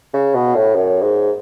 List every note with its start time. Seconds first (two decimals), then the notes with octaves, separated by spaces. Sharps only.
0.14 C#3
0.34 B2
0.55 A2
0.75 F#2
1.02 G#2